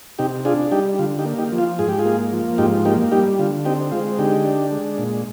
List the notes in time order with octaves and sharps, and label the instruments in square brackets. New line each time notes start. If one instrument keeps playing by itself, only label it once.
[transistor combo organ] C3 D#4 G4
D4 F4 G#4
G3 D#4 G4
D3 F4
D#4 G4
A#3
D#4 G4
F3
F4
G#2 G#4
G4
F4 G#4
A#3
F3
G#2 D#4 G4
A#3 D#4 G4
G3 D#4 G4
D3 F4
C4 D#4 G4
G#3 F4
D3 D#4 G4
D4
G#3
A#2